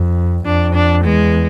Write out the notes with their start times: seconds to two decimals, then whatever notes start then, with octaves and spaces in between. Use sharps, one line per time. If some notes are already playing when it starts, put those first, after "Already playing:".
Already playing: F2
0.45 F2 D4
0.74 D4
1.04 E2 G#3